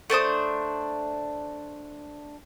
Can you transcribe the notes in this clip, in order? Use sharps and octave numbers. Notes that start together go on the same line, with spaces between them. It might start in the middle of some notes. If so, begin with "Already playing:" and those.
A3 D4 C5 D#6